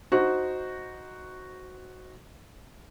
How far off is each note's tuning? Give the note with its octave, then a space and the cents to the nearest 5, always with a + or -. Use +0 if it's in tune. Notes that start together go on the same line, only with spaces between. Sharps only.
D#4 +0 F#4 +0 C5 -5